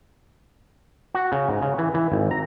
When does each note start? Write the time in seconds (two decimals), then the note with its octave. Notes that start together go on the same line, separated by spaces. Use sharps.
1.15 F#4
1.32 C#3
1.49 G#2
1.62 C#3
1.78 E3
1.94 E3
2.12 G#1
2.31 A#5